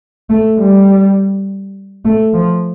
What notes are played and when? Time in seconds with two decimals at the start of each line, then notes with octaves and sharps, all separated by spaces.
0.30 A3
0.59 G3
2.05 A3
2.33 F3